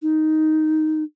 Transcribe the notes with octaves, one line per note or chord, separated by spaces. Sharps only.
D#4